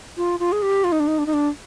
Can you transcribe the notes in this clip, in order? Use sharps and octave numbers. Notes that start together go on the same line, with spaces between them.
F4
F4
G#4
G4
F4
D#4
D4
D#4
D4
D#4
D4